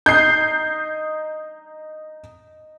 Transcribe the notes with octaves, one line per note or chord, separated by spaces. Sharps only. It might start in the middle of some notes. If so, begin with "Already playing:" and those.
D#4 G6 C7